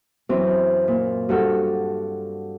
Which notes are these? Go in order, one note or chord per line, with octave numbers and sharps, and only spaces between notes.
F#2 E3 C4
A#2
G2 F#4 A4 F6